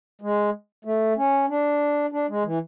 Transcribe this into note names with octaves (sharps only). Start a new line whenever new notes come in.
G#3
A3
C#4
D4
D4
G#3
E3